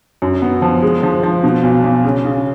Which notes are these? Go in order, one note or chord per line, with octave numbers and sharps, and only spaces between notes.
F#2
B3
F3
G#3
F3
F3
B2
B1
B1
C#3
C#3